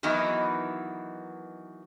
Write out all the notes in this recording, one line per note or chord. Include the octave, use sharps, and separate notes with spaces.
D#3 E3 F#3 B3 D#4 E4